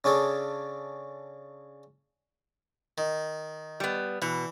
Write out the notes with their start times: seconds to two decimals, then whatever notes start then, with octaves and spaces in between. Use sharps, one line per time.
0.04 C#3 C#4 D4 G#4 A4
2.98 D#3
3.80 G3 B3
4.22 B2 E3